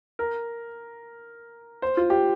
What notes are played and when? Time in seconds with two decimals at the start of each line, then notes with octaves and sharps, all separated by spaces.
0.19 A#4
1.82 C5
1.97 F4
2.10 G4